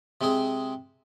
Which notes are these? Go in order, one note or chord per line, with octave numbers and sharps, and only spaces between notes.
C3 G#3 C4 G#4